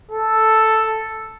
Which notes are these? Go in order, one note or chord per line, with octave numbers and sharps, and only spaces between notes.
A4